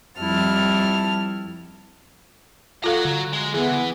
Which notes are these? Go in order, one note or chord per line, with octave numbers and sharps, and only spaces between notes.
F2 G3 E4 A5 F6
F4 F#4 A4 F5 A#5
D3
G#3
E3 B3 G#4